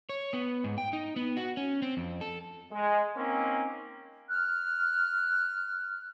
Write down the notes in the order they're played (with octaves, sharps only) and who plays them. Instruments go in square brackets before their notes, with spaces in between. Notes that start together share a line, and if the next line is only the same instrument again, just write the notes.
[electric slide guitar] C#5
B3
G#2
G5
D#4
B3
F#4
C#4
C4
F2
A4
[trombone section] G#3
A#3 C4 C#4 D#4
[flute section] F6 F#6